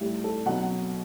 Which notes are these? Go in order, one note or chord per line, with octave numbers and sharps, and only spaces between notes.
A2 G3 G4
A4
B2 F#3 F#5